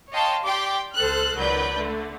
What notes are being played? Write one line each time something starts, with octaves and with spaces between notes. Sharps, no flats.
C#5 D#5 F5 G5 A5 C6
G4 D5 G5 C6 D6
C#2 A4 C5 F6 F#6
C#2 D#3 F#3 B4 D5 G6
D3 A3